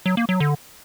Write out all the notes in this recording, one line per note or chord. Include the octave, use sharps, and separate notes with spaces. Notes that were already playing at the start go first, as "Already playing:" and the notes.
F#3
A#3
F#3
D3